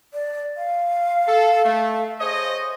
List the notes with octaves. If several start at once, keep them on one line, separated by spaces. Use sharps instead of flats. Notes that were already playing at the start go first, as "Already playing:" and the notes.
D5
F5
A4
A3
G#4 C5 C#5 D#5